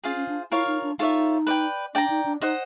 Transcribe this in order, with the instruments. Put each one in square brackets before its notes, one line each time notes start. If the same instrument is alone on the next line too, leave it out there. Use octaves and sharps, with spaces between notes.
[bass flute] C#4 [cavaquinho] F4 G#4 C5 F5
[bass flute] C#4
D4
[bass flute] E4 [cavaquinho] F4 A#4 C#5 F5
[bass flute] D#4
D4
[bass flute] D#4 [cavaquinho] F4 A4 C#5 E5
[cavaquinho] B4 D5 G5
[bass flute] D4 [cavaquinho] D5 G5 A#5
[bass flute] D#4
D4
[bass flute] D#4 [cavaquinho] C5 D#5 F#5